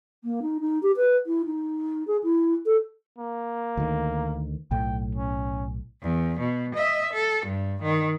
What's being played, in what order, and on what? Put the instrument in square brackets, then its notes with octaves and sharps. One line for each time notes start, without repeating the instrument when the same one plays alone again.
[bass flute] A#3
D#4
D#4
G4
B4
E4
D#4
G#4
E4
A4
[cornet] A#3
[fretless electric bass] D2 D#3
[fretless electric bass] B1 A2 [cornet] G5
[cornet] C#4
[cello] E2
B2
D#5 E5
A4
G2
D#3